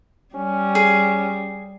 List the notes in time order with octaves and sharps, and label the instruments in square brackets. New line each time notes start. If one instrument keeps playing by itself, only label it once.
[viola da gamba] G3 [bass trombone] C#4
[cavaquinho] G#4